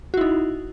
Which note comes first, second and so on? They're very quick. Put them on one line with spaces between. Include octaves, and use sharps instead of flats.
F#4 E4 D#4